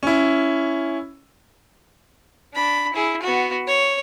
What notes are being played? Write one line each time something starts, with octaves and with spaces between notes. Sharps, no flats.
C#4 E4
D4 B5
E4 G#4
B3 F#4
C#5